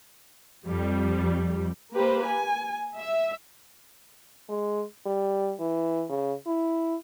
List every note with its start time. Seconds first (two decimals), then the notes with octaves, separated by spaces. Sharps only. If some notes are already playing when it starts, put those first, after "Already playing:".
0.66 F2 G3
1.94 A#3 G4 B4 C5
2.24 G#5
2.98 E5
4.49 G#3
5.06 G3
5.60 E3
6.10 C#3
6.47 E4